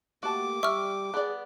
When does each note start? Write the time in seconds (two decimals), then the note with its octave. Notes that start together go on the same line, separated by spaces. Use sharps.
0.23 A3 A#3 F#4 G4 A5 D6
0.63 G3 G4 E5 C#6 F6
1.14 B3 G#4 D5